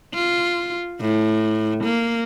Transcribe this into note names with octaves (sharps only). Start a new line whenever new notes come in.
F4
A2
A#3